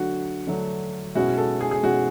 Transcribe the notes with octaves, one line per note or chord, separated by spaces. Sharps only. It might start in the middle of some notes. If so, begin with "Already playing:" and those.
Already playing: D3 F#3 A3 D4 F#4
D3 F#3 A3 D4
B2 G#3 C#4 E4 F#4
A4
G#4
G#4
B2 G#3 C#4 E4 F#4